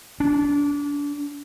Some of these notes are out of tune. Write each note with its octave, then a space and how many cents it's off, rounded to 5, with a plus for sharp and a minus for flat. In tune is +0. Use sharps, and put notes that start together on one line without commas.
D4 -30